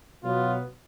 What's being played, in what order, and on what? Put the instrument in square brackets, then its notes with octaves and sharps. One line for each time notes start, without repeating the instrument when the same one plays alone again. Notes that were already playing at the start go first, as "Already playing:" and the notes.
[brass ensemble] B2 F#3 B3 F4